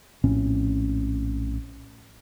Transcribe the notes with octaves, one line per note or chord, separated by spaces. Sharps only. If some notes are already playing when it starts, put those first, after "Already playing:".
A#1 A2 C4 C#4